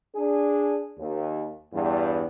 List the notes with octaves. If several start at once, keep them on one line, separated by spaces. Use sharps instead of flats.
D4 G#4
D#2
E2 G2